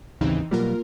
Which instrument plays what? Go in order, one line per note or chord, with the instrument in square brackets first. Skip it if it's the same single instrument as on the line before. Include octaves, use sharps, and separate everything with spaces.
[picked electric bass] A1 D#2 C#3 [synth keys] E3 C4 D#4
[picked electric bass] B2 F#3 G3 [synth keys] A#3 F4 A#4